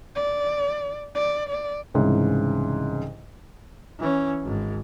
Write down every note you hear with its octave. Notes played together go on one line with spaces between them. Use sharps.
D5
D5
D5
C2 G#2 C#3 E3
E3 C#4
G#1 G#2